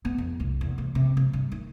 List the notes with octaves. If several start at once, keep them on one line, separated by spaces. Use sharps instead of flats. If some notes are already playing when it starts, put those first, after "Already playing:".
B3
F2
C2
E2
C3
C3
C3
G2
D#3